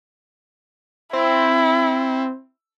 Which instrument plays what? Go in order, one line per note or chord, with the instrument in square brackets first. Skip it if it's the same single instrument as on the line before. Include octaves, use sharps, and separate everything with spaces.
[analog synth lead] C4 [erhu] E4